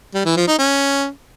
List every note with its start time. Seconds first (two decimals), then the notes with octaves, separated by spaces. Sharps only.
0.14 G3
0.25 E3
0.36 F3
0.47 D#4
0.58 C#4